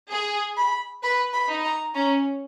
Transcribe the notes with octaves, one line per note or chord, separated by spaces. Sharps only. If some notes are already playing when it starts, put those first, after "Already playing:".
G#4
B5
B4 B5
B5
D#4
A#5
C#4 A#5